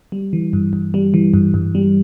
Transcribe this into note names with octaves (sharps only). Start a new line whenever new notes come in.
G3
E3
G2
G2
G3
E3
G2
G2
G3